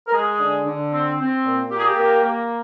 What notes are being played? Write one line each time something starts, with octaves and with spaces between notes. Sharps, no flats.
A#4
G#3 G#4
D3
D3
C4
C4
A#2
A#3 G4
G#4
G4
A#3
A#3